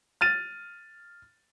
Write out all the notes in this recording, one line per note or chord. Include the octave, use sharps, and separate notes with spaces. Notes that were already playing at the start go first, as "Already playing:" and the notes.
F6 A6 D#7